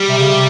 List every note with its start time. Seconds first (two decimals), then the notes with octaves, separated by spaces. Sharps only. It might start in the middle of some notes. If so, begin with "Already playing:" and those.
Already playing: G3
0.08 C3
0.18 C#3
0.29 C3